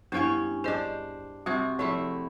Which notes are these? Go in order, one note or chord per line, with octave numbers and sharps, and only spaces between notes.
G2 B3 C#4 E4 C#5 F5
D4 G#4 C5 D#5
C3 G3 C4 F#4 E5
F3 A3 E4 G#4 E5